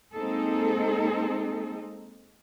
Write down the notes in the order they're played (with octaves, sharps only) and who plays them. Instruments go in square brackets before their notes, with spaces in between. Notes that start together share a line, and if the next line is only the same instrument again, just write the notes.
[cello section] G#3 A#3 C4 D#4 G#4 A4